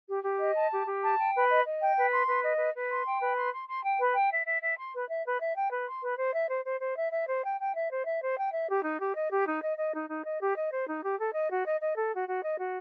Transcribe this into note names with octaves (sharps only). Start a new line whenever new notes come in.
G4
G4
D#5
A5
G4
G4
A5
G5
B4
D#5
D#5
G5
B4
C6
B4
D#5
B4
B4
C6
G5
B4
C6
C6
C6
G5
B4
G5
E5
E5
E5
C6
B4
E5
B4
E5
G5
B4
C6
B4
C5
E5
C5
C5
C5
E5
E5
C5
G5
G5
E5
C5
E5
C5
G5
E5
G4
D#4
G4
D#5
G4
D#4
D#5
D#5
D#4
D#4
D#5
G4
D#5
C5
D#4
G4
A4
D#5
F#4
D#5
D#5
A4
F#4
F#4
D#5
F#4